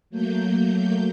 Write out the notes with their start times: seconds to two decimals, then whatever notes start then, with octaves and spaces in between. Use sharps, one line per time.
0.10 F#3 A3 A#3 G6